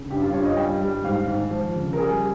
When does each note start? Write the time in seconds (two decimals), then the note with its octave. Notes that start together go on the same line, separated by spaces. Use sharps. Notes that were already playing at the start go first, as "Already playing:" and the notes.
Already playing: C#3
0.10 G2 G4
0.22 F4
0.33 G2 C#5
0.45 D#5
0.57 G3 G5
0.81 G3
1.04 G#2 F5
1.28 G#2
1.51 F3
1.75 C#3
1.93 A#4
1.98 G3 G#4